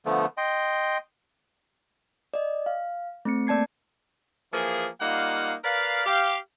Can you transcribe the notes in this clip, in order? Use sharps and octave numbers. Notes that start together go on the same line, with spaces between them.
D3 F3 A3 B3
D#5 G5 C6
D5 D#5
F5
A3 C4 C#7
A#3 D5 A5 G#6 C7
E3 F3 A#3 G#4
G3 A#3 D#4 F4 F5 F#5
A#4 B4 D5 F5
G4 F5